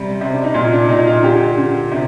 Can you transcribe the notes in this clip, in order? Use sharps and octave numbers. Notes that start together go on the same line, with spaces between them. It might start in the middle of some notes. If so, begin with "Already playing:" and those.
Already playing: C3 G3
C3
D4
D#4
A#2 F4
D4
A#2 D#4
F4
D3 G4
D3
C3